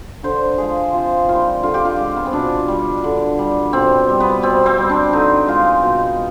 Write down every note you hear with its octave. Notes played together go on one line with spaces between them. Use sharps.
D3 C5
F3 G#3 G#4
C3 F4
D#3 G3 F4
D3 F4
G4
F4
G#3
B3
C4
B2 D4
G3
D3
G3
B2 C4
G3
B3
B2 C4
C4
G3
D4
D3 D#4
G#3 F4
B2